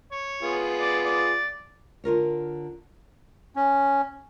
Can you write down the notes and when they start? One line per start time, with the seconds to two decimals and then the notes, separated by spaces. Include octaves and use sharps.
0.11 C#5
0.42 B3 F4 G#4
0.80 D5
1.05 D5
2.04 D3 F4 A#4 C#5
3.56 C#4